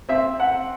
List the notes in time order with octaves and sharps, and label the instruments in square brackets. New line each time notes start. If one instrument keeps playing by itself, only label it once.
[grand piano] C4 [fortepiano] E5
[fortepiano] F#5